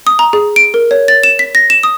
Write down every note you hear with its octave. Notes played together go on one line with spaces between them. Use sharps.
D#6
A#5
G#4
D7
A#4
C#5
A6
E7
B6
A#6
E7
D#6